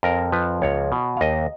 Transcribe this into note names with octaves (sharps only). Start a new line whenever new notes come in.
F2 A#4
F3 B4
C#2 C#5
B2
F5
D#2 D#5